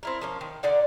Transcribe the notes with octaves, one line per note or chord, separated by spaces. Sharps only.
C4 E4 A#4
F3 A#3 C#4
D#3
D3 D#4 D5 F#5